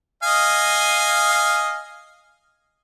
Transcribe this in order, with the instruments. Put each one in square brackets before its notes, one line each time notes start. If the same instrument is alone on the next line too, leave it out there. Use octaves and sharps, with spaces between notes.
[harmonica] D#5 F5 G#5